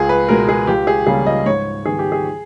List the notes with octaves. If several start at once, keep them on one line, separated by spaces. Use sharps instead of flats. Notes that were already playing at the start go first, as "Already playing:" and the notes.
Already playing: C#2 G#4
B4
B2 G#3 B3 A#4
G#4
C#2 G4
G#4
C#3 G3 A#3 C#4 G#4
D#5
G#2 C#5
D#3 G3 B3 G#4
G4
G#4